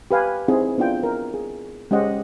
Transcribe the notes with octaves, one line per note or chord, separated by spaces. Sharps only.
G4 B4 F5 G#5
C4 D#4 E4 G#4
B3 D4 E4 F4 G5
A#4
G#4
G#3 C#4 G4 C5 D#5 F#5